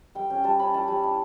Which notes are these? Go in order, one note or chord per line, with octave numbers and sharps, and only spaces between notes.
G3 G5
C#4 G5
G3 A5
C#4 B5
E4 A5
G3
E4